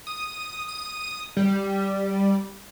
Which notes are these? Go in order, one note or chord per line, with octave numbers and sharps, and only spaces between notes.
D#6
D#6
G3